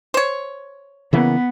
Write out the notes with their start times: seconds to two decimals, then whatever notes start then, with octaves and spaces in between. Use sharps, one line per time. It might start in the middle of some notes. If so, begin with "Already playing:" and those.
0.14 C5 C#5
1.13 C#3 E3 A#3 B3